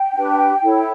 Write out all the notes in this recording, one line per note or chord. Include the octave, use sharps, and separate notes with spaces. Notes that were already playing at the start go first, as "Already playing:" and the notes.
Already playing: G5
D4 G4 B4
E4 A4 C#5